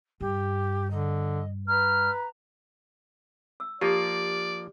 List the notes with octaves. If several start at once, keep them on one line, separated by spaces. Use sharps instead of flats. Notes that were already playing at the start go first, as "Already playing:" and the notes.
G2 G4
D3 D#5
B4 A#5 F6
E6
F3 A#3 F4 G4 D5